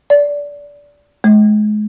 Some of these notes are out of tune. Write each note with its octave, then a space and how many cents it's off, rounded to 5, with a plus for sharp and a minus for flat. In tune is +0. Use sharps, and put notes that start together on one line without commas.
D5 -20
G#3 +35